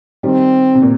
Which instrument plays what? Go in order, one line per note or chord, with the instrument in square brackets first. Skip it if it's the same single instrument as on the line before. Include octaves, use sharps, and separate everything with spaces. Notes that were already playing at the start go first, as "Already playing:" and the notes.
[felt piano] D#3 G3 [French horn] C4
[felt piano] C3
A#2